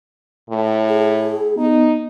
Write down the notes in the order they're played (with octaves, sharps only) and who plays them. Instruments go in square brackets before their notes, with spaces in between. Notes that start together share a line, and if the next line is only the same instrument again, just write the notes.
[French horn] A2
[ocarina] G#4
[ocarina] B3 [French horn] D#4